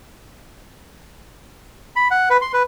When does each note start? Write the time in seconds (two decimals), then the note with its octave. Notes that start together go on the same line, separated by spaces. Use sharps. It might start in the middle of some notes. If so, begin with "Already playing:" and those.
1.96 B5
2.11 F#5
2.30 B4
2.42 C6
2.53 B4